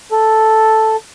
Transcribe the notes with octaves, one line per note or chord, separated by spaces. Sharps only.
A4